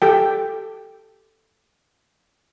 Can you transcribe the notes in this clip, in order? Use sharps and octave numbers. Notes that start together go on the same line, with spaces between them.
G4 A4 G5